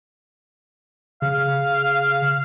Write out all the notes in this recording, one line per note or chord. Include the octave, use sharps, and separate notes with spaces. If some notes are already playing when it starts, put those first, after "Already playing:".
C#3 F5